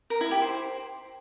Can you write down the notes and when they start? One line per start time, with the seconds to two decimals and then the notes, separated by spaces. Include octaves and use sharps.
0.10 A#4
0.21 E4
0.31 G4
0.42 C5